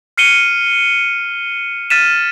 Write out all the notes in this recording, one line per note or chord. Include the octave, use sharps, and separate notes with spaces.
F6 C7 C#7 D#7 G7
F6 A6 B6 D#7 E7